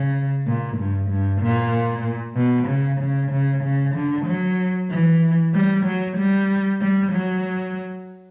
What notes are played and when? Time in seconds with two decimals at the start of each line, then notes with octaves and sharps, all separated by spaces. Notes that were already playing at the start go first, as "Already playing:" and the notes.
Already playing: C#3
0.47 A#2
0.78 G2
1.10 G2
1.42 A#2
2.36 B2
2.68 C#3
3.01 C#3
3.32 C#3
3.64 C#3
3.95 D3
4.26 F#3
4.90 E3
5.54 G3
5.86 F#3
6.17 G3
6.81 G3
7.12 F#3